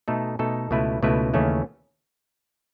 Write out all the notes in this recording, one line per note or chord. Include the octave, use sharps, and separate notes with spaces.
B2 A3 D#4 A4
B2 A3 D#4 A4
C#2 B2 A3 E4 B4
C#2 B2 A3 E4 B4
D#2 C#3 E3 A3 C#4